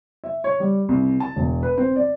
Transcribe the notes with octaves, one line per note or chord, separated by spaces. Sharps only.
E5
C#5
G3
C2
A5
E1
B4
C4
D5